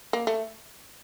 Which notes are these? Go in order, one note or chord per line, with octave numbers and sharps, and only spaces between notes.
A#3
A3